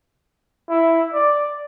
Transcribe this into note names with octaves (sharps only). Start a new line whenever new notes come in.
E4
D5